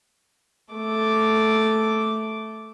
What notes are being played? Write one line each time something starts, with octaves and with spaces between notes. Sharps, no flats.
A3 D6